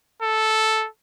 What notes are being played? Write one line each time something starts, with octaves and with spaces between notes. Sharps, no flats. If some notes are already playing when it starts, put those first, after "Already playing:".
A4